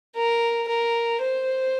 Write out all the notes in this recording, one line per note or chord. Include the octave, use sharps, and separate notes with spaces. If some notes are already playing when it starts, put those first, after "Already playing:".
A#4
A#4
C5